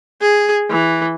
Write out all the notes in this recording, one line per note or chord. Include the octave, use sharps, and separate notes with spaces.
G#4
E3